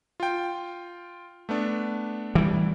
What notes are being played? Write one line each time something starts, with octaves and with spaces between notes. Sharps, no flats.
F4 G5
A3 B3 D4
E3 G3